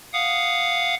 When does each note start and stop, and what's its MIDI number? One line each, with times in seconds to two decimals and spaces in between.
0.13 0.95 77
0.13 0.95 78
0.13 0.95 87